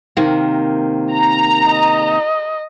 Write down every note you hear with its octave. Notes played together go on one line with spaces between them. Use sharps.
C3 D#3 A#3
A#5
D#5